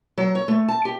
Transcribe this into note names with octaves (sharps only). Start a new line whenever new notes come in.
F#3
C#5
A3
A5
G4